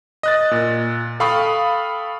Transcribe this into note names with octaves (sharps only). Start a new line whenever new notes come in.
D#5 F#6 A6
A#2 A6
A4 F5 G5 B5 C#6 D#6